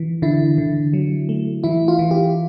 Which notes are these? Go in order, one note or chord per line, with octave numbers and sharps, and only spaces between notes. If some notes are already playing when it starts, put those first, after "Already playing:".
Already playing: E3
D3 E4
D3
F#3
A3
E3 E4
F4
E3
F4 G4